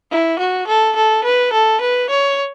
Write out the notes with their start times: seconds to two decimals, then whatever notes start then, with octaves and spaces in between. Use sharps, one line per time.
0.11 E4
0.39 F#4
0.67 A4
0.96 A4
1.24 B4
1.53 A4
1.81 B4
2.10 C#5